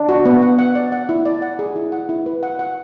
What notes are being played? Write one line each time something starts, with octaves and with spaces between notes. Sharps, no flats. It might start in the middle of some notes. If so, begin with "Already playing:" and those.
Already playing: D4
F#4
B3
F#5
F#5
D5
F#5
E4
D5
F#5
G#4
E4
F#5
E4
B4
F#5
F#5